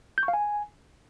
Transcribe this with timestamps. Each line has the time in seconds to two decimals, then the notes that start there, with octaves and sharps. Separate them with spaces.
0.18 G6
0.23 C#6
0.28 F5
0.34 G#5